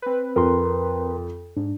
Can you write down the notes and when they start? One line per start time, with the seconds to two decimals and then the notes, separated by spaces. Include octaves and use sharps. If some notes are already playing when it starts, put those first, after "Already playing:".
0.02 C4 B4
0.36 F2 A#4 A#5 C6
1.57 G#2 D4